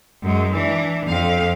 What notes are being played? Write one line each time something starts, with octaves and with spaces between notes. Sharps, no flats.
F#2 G#3
E3 D4
F2 F5